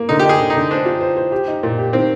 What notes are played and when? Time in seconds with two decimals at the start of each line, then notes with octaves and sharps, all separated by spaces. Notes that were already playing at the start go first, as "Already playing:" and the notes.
Already playing: A#3
0.09 D3 D#4
0.19 G4
0.25 D#4 G#4
0.40 D3
0.50 D#4
0.55 D3
0.71 D4 C5
0.86 F4
1.01 C5
1.17 C5
1.32 G4
1.48 D#4
1.63 A#2
1.78 G4
1.93 D#3 C4